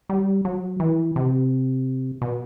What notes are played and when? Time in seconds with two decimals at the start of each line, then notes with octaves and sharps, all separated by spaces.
0.09 G3
0.45 F#3
0.80 E3
1.16 C3
2.22 B2